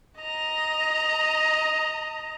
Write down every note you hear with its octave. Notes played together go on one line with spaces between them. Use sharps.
D#5 A#5